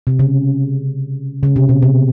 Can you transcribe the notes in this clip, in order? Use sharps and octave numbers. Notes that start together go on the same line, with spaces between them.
C3
C#3
C#3
C3
B2
C3